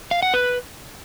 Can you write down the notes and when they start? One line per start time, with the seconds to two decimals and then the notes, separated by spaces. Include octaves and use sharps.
0.11 F5
0.22 F#5
0.34 B4